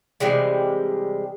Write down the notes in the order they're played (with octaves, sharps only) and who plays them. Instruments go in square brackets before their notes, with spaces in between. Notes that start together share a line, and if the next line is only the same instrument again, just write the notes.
[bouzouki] C3 E3 G3 G#3